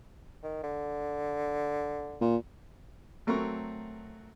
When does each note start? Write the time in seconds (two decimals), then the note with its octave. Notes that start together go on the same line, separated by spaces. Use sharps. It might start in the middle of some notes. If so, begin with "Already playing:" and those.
0.43 D#3
0.63 D3
2.21 A#2
3.27 F#3 A3 C4 A#4 A#5 C#6